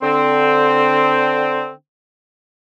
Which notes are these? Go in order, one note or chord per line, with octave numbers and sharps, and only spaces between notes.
D3 C4